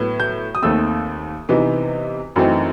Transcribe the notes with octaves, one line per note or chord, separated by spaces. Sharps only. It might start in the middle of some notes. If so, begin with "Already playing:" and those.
Already playing: A2 F#3 B3
G6
D#6
D#2 D#3 A3 C4 E6
C3 E3 B3 D#4
F#2 E3 A3 C4 D#4